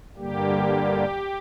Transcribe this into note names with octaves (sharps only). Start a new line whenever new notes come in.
G2 D3 G3 A#3 G4